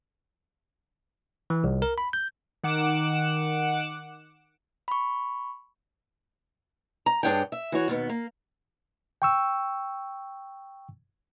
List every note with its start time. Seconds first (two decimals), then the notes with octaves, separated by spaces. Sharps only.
1.50 E3
1.64 C2
1.82 A#4
1.98 B5
2.13 G6
2.64 D#3 F#5 D6 E7
4.88 B5 C#6
7.06 A#5
7.23 G2 D4 G#4 C#5 F#5 G5
7.52 E5
7.72 E3 F#4 C#5
7.88 D#2 B2 B3
8.09 A#3
9.22 G5 C#6 E6